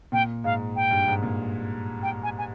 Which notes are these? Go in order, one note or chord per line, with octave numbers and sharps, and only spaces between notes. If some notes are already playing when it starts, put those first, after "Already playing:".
A#2 G5
G#2 F5
G5
G2
G#2
A#2
G5
G#5
G#5